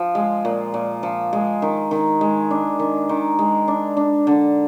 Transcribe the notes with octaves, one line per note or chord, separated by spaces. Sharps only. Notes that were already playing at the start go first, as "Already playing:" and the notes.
Already playing: F3
G#3
A#2
A#2
F3
G#3
D#3
D#3
G#3
D4
D#3
D#3
G#3
D4
D4
D3